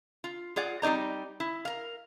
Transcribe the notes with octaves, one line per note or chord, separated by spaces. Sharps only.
F4
F4 G#4 D5 F#5
G3 C4 D#4 D5 A#5
E4
A#4 F5